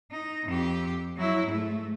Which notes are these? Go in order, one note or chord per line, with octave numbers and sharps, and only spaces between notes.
D#4
F2 G4
F#3 E4
G#2 A3